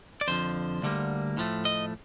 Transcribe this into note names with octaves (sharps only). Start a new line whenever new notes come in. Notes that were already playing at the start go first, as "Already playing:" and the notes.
D5
F2 D3 F3 C5
D2 D3 G3 A#3
A2 F3 A3
D#5